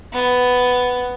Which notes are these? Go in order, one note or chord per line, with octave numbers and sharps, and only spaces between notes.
B3